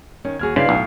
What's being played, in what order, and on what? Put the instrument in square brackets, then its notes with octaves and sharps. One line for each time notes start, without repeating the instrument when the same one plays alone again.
[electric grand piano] D#3 [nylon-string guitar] C#4
[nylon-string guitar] D#2 G#4 [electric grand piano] F#4 F6 G#6
[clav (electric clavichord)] C#3 [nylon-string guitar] D4 E4 B4 [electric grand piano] D5 C6 [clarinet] F5
[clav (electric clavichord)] B1 [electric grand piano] A2